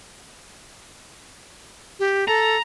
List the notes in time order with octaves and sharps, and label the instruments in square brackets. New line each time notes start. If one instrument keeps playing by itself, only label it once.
[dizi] G4
[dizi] A4 [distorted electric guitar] A#5